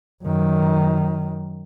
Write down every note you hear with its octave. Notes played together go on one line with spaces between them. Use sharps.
F#2 D#3